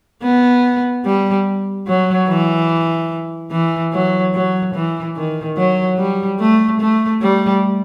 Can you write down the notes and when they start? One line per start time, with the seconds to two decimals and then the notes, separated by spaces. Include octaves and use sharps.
0.23 B3
1.05 G3
1.87 F#3
2.28 E3
3.51 E3
3.93 F#3
4.34 F#3
4.74 E3
5.16 D#3
5.57 F#3
5.98 G3
6.40 A3
6.80 A3
7.22 G3